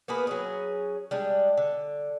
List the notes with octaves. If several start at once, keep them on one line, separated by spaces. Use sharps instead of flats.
A#3 B3 G#4 B4
F#3 C#4 G#4
G3 G#3 D4
D3